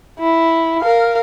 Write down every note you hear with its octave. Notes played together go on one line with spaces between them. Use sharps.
E4
A#4 F5